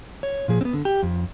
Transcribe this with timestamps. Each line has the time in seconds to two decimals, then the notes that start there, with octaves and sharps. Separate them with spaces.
0.23 C#5
0.48 A#2 F3 G#4
0.61 B3 C4
0.73 D3
0.85 G4
1.03 F2